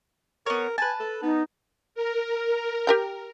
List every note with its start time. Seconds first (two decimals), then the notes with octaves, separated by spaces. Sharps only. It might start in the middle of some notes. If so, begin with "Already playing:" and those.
0.46 B3 A#4 C#5
0.78 B4 G#5 A5
1.00 A4
1.22 B3 D#4
1.95 A#4
2.87 G4 A#4 G5